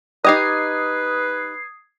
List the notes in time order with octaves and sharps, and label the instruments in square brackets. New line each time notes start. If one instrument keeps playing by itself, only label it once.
[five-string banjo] D#4 G4 D#5 [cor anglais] B4 [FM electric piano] D#6 G#6 C7